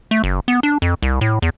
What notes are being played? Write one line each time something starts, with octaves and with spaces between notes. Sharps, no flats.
A3
F#1
B3
D4
F2
C2
A2
E2